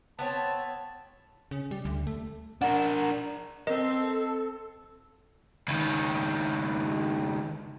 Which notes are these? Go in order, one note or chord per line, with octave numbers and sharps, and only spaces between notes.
B3 C4 C#5 A5
C#3
G3
D2
A3
D4 A#4 F#5
C4 A4 A#4 D#5
C#2 D#3